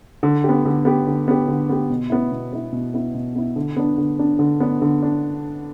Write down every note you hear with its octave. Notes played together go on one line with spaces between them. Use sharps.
D3
B3 G4
D3
B3 G4
D3
B3 G4
D3
B3 G4
B2
B3 E4
B2
B3 E4
B2
B3 E4
B2
B3 E4
D3
B3 D4
D3
B3 D4
D3
B3 D4
D3
D4